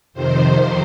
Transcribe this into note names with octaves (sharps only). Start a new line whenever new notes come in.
F2 C3 D#3 C5